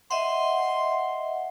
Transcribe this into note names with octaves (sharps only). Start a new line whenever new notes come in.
D#5 E5 F#5 C6